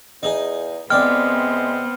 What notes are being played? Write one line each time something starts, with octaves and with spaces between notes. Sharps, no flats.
E2 D#4 G#4
C2 G#3 B3 C4 D5 G5 F6